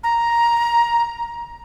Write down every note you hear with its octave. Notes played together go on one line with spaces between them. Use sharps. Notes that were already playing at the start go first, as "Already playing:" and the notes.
A#5